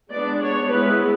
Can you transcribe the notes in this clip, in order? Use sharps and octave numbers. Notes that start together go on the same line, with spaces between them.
G#3 B3 D4 D5
C#5
G#3 B3 E4 B4